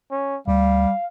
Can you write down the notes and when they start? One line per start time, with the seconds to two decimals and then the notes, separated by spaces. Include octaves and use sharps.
0.11 C#4
0.48 D2 G3 F5